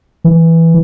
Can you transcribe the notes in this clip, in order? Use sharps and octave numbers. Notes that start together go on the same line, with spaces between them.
E3